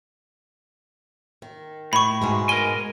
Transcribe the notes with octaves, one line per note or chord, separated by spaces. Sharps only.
D#3
A2 B5 C#6
G#2 B2 G#3
A#4 G#5 G7